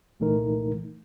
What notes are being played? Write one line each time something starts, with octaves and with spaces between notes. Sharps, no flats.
C2 A#2 E3 A3 D#4 A#4